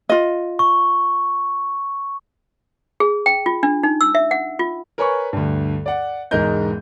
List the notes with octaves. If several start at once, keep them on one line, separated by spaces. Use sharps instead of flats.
F4 D#5
C#6
G#4
G5
F4
D4
D#4
E6
E5
F#5
F4
A#4 B4 C#5 G#5 B5 C#6
D2 G2
D5 F#5
E1 G#2 G#3 A#4 D#5 G6